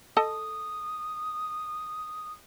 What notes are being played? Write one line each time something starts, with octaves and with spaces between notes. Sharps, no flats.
A4 D#5 A5 D#6